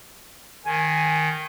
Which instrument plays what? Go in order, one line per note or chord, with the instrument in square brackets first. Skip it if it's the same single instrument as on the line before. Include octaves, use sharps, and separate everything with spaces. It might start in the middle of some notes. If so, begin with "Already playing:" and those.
[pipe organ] D#3 [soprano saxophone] G#5